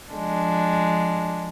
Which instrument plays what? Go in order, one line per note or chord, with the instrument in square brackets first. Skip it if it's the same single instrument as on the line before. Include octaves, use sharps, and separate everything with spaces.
[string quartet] F3 G#3 D4